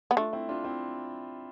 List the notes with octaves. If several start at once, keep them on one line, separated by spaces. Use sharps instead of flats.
B3
A3 D4 F4
C4 E4
D4 F4
C4 E4